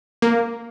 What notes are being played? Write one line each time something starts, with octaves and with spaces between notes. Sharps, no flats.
A#3